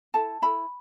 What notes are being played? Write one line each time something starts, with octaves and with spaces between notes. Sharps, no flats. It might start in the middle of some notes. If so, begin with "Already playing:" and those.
E4 A4 A5
E4 A4 B5